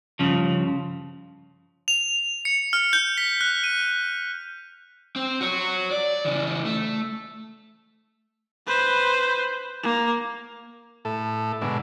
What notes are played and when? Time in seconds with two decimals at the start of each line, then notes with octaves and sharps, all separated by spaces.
0.19 G2 C#3 F3
1.88 F7
2.45 C#7
2.73 F6
2.93 G6
3.18 B6
3.41 F#6
3.64 D#7
5.16 C4
5.41 F#4 C#5
5.91 D5
6.25 C#3 E3
6.65 A3
8.67 B4 C5
9.83 A#3
11.05 A2 A4
11.61 G#2 B2 D3